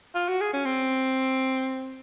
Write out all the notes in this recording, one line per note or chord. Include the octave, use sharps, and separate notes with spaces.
F4
F#4
G#4
C#4
C4